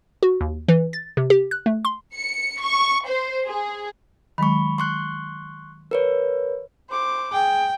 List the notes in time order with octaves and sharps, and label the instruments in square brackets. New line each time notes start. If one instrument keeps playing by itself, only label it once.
[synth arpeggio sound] F#4
D#2
E3
A6
C3
G4
F#6
A3
C6
[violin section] C#7
C#6
C5
G#4
[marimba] D#3 F#3 G#3 [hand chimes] B5 C#6
[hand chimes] C6 C#6 F#6
A#4 B4 C#5
[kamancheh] C5 D6
[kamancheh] G#4 [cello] G5